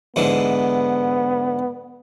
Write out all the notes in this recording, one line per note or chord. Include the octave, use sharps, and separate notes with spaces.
G#2 D3 E3 B3